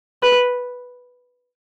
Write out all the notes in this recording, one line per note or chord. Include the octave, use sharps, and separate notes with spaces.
B4